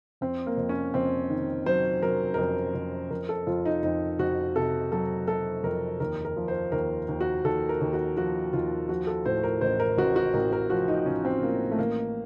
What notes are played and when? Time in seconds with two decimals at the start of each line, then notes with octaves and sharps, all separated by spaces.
0.21 F2 C4
0.46 A#3
0.57 F2
0.69 C#4
0.94 F2 C4
1.30 D#3
1.66 F#3 C5
2.02 F#3 A#4
2.34 A#4
2.38 F2 C5
2.75 F2
3.10 F2 A#4
3.29 A4
3.47 F2 F4
3.66 D#4
3.83 F2 D#4
4.19 F2 F#4
4.56 C3 A4
4.92 F#3 A4
5.28 F#3 A4
5.63 F2 A#4
6.00 D#2 A#4
6.25 A#4
6.37 F3
6.48 C5
6.72 D#2 A#4
7.08 D#2
7.21 F#4
7.44 D#2 A4
7.69 A#4
7.81 D#2
7.93 F#4
8.17 F3 F#4
8.53 D#2 F4
8.89 F3 F#4
9.07 A4
9.26 A2 C5
9.44 A#4
9.61 A1 C5
9.80 A#4
9.98 A1 F#4
10.16 F#4
10.34 A1 A#4
10.52 A#4
10.70 F3 F#4
10.88 D#4
11.06 A1 C#4
11.25 C4
11.43 A2 A#3
11.71 A3
11.79 A1 A#3